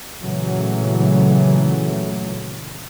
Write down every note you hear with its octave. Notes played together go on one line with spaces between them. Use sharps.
A#2 C#3 E3 F#3 A3